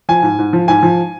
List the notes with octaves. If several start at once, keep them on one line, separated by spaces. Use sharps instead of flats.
F3 G#5
G#2
G#2
F3
G#2 G#5
F3